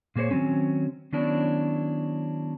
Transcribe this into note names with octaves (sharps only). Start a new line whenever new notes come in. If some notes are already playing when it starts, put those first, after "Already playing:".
A#2 A#3 G#4 C5 C#5
D#3 F3 F#3 C4 C#4
D#3 F#3 B3 C#4 D4 E4